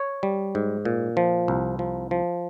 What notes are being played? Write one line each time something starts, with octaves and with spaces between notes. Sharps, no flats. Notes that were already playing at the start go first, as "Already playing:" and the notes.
Already playing: C#5
G3
G#2
A#2
F3
C2
F3
F3